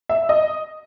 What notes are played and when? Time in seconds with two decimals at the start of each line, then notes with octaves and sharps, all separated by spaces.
0.09 E5
0.29 D#5